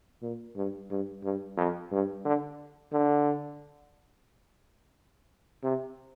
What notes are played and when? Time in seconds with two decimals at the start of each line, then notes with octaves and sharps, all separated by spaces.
0.22 A#2
0.56 G2
0.90 G2
1.23 G2
1.57 F2
1.91 G2
2.25 D3
2.92 D3
5.63 C3